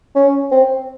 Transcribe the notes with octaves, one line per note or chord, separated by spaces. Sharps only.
C#4
C4